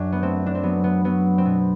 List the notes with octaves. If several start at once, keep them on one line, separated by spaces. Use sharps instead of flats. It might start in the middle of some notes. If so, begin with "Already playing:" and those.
Already playing: F#2 D4
B3
A3 C4
D4
C4
F#3 B3
B3
F#3 B3
C4
B2 B3